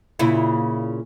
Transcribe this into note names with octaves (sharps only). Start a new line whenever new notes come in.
A#2 C#3 E4